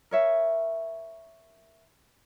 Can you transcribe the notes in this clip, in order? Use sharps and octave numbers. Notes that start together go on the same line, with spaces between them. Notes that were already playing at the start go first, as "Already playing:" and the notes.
A#4 C#5 E5